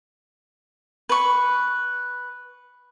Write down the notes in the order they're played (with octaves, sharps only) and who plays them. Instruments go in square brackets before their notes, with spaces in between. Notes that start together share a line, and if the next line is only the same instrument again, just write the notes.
[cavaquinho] B4 C#6